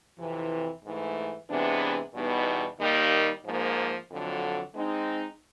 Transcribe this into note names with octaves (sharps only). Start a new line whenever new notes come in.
F2 C3 E3
G#2 E3 A3
C3 E3 G#3 B3 D4
E2 B2 G3 B3 D#4
D#2 D#3 G3 A#3 D#4
G#2 F3 A#3
F2 D3 F#3
G#3 C4 D#4